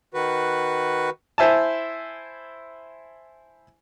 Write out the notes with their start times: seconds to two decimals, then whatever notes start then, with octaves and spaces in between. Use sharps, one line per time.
0.14 D#3 F#4 B4
1.38 E4 C5 E5 G#5 A5